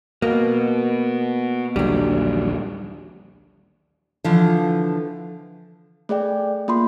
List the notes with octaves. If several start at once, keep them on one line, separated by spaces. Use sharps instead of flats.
B2 A#3
A#1 D#2 D3 F#3 G3
D3 E3 F3
A3 G#4 D5 G5
A#3 F4 B5 C6